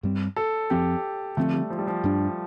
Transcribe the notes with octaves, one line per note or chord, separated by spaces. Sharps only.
G2 G3 C4
A4
F2 F3 C4 G4
D3 F3 A3 C4
G3
F3
G3
F3
G2 G3 D4